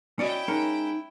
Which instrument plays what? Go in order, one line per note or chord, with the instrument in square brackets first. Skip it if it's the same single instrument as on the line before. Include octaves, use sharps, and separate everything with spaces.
[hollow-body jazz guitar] C#4 D5 D#5 [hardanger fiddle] E4 G5 [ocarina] F#4
[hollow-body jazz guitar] G#3 C#4 A#4 [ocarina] D#4